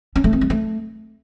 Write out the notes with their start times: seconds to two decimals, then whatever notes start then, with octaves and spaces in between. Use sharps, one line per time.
0.16 C#4
0.24 A3
0.33 C4
0.41 G#3
0.50 A3